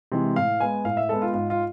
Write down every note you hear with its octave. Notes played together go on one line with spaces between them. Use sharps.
C3 E3 G#3
A2 F5
G#3 B3 G#5
A2 F5
E5
G#3 B3 A4
F4
G#2 F4
F4